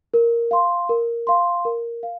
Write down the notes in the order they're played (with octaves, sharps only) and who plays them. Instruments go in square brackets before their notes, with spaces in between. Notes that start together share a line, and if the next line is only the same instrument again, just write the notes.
[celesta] A#4
F5 C6
A#4
F5 C6
A#4
F5